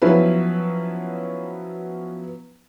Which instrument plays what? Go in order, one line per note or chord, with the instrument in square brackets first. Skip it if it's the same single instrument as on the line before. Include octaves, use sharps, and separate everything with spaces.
[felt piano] F3 F#3 B3 C#4 E4 B4